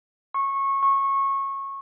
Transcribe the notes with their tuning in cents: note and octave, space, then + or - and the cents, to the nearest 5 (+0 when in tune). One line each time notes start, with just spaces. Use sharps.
C#6 -20
C#6 -20